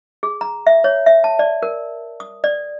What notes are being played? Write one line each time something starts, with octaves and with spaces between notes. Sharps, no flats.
G#4
A#5
E5
C#5
E5
A5
D5
A#4
D#6
D5